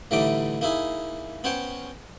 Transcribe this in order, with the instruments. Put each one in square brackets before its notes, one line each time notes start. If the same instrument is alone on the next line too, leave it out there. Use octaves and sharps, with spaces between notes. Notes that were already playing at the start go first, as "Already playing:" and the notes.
[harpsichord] A2 D3 E3 G3 D#4 D6
A#3 D#4 E4 G#4
B3 C#4 C5 C#5 G5